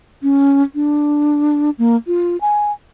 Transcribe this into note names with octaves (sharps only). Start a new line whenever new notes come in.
C#4
D4
A#3
F4
G#5